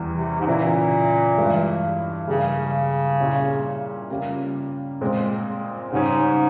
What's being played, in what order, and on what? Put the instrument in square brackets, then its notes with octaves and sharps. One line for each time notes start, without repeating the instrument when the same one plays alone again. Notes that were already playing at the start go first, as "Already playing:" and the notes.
Already playing: [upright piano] E2 E3 G3
[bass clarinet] C3
G#2
[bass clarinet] A#2 [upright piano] C#3 E3 A#3 E4
[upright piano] G2 E3 G#3 E4
[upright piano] G2 G3 A#3 [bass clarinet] C#3
[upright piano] A#2 G3 C#4 E4
C#3 G3 A#3 F4
A#2 G#3 C4
[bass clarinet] G#2 [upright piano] C#3 G3 C#4